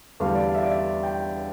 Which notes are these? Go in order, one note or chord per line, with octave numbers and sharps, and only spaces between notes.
E2 D3 G3 F5
D5
F5
E5
D5
E5
G5